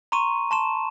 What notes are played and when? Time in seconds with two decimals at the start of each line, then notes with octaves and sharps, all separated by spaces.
0.12 A#5 C6 C#6 D#7
0.51 A5 C6 E7